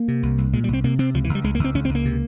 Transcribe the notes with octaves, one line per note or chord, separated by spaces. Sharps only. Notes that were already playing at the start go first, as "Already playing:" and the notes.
Already playing: A#3
C3
C2
C2
A#2 G#3
G3
C2
C4
C3 A#3
C3 C4
C#2 F3
E3
C#2
G3
C#2 G#3
A#3
C#2 C4
C#2 C#4
C4
C#2
A#3
C3